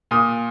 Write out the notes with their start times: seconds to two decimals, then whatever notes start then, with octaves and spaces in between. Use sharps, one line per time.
0.11 A#2 D#6